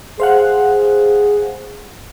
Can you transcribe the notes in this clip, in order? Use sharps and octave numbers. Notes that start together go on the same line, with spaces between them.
G#4 C5 F5 F#5